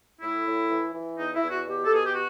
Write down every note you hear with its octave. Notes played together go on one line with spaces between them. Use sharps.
A2 E4
A2
E3
E3
E2 D#4
E4
E2
F#4
B2 G4
A4
B2 G#4
G4
F#4